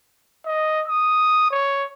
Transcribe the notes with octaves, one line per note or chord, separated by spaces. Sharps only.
D#5
D#6
C#5